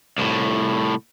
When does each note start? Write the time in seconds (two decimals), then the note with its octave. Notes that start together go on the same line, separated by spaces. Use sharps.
0.18 C2 A2